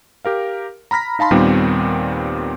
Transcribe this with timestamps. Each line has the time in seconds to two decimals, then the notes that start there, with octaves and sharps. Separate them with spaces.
0.25 G4 A#4 F5
0.91 A#5 B5 F6 A#6 B6
1.19 D#4 F5 A5 B5 C6
1.31 D#2 A#2 D#3 G3 B3 C4